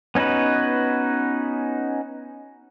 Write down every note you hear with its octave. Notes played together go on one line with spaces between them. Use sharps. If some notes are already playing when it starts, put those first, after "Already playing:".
B3 C#4 D#4 F#4 B4